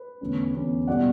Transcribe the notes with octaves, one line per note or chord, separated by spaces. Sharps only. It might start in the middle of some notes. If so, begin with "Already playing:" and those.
Already playing: B4
E2 D3 A3 C#4
E2 D3 A3 C#4
B2 G3 B3 D5 F#5